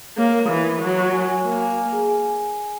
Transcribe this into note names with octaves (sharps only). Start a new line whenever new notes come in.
A#3 C#5
A#4
E3 E4
A#4
F#3 C#6
C#6
G#5
G#5
A#3 A#4
G#5
G#5
G#4
G#5